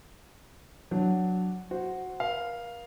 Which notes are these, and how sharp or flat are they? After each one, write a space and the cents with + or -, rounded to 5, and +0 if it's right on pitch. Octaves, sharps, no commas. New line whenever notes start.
F#3 -5 D4 +0 F#5 +0
F#4 +0 C5 +0
A#4 +40 F5 +0